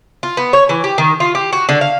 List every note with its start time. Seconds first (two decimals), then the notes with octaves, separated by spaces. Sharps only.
0.23 F4
0.37 B3
0.53 C#5
0.69 E3
0.84 G4
0.98 D#3
1.20 F4
1.35 G4
1.53 F#4
1.69 D3
1.81 F5